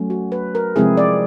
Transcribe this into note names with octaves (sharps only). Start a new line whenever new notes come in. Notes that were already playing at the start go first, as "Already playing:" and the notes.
Already playing: F#3 A3 C#4
F#4
B4
A#4
C3 F3 G#3 C4 E4 G#4
D5